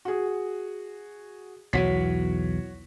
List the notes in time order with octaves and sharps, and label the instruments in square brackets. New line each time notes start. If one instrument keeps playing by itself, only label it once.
[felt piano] F#4 G#4
[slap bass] B1 E2 E3 [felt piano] F#4 C#5 B6